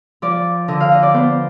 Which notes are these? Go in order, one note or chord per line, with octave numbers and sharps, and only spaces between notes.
F3 D5
D3 D#5
F5
D#5
D5
B3 C5